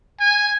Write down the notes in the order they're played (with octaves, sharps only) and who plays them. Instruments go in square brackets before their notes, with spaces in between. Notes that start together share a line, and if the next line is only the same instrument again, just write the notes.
[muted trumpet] G#5